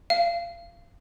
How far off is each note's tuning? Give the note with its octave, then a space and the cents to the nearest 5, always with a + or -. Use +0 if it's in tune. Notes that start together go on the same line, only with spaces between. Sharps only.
F5 -25